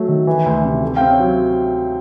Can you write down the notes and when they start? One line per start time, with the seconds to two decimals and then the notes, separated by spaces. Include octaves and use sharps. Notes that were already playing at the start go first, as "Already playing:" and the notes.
Already playing: F#3 A3
0.08 D#3
0.27 E3
0.46 D2
0.64 C3
0.83 A3
0.96 C4 F5 G5
1.10 C#5
1.19 F#3